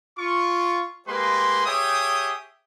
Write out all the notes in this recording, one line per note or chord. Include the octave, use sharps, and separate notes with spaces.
F4 C#6
G#3 A#3 G4 B4 C6
G4 G#4 C#5 E5 G5 D#6